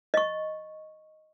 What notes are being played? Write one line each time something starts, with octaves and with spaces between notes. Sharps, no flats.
D#5 C#6